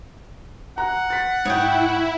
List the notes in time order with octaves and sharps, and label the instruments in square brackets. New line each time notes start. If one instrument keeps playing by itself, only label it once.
[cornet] F#5 [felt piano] A#5 F#6
[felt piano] A6 B6
[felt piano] G#2 D#6 [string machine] E4 [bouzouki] C#5 G5